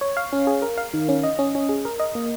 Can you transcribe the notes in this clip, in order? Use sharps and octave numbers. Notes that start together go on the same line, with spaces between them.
C#5
F5
C#4
G#4
A#4
F5
D#3
C#4
D#5
C#4
C#4
G#4
A#4
D#5
A#3